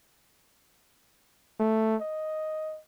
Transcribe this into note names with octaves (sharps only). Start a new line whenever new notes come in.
A3
D#5